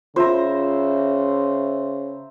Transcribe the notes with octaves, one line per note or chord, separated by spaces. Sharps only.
C#3 F4 C5 E5 A#5